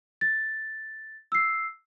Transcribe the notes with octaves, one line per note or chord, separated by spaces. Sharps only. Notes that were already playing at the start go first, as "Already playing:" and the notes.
A6
E6 C7